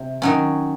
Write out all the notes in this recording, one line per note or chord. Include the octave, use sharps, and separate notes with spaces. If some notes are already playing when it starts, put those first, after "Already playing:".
Already playing: C3
D#3 F#3 C#4